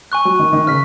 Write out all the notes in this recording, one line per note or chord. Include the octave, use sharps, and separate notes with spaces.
G#5 C#6 F#6
F#3
D#3
D#3
C#3 F6 B6